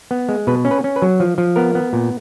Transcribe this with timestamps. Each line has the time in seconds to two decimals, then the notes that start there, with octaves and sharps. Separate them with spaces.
0.11 B3
0.29 G#3
0.47 B2 B4
0.65 C#4
0.71 B4
0.84 C#4
0.96 B4
1.02 F#3
1.20 F3
1.38 F3
1.56 B3 A#4
1.75 B3
1.93 A#2